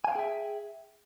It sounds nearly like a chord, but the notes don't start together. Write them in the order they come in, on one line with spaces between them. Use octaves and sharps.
G#5 F5 G5 G#4 E5